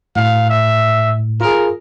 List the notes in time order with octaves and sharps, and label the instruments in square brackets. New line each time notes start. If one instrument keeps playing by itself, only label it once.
[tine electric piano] A2 [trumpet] F5
[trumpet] E5
[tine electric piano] F4 G#4 [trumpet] A#4